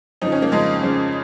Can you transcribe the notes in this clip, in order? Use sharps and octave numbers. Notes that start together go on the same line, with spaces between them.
F2 C#3 F3 D#4
C#4
A#3
F2 C#3 F3 G#3
F2 C#3 F3